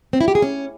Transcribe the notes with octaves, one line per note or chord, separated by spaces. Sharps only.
C4
E4
G4
G#4
C#4